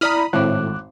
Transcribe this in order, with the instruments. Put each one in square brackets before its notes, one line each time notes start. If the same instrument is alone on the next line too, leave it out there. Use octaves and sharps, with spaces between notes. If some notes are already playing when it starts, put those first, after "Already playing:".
[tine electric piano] E4 D5 A#5 [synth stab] B5 D#6 F6
[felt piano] G#1 [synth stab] A2 [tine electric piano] D6 F#6